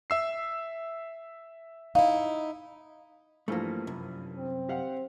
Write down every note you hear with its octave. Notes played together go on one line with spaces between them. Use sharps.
E5 E6 C7
D#4 E4 F5
G2 E3 F3 A3 A#3
C2 F#2
C4
G4 F5 F#5